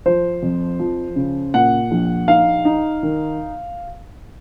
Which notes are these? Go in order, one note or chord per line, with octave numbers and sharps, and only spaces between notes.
F3 C5
F2
F3
C#3
A#2 F#5
A#1
D#4 F5
D#4
D#3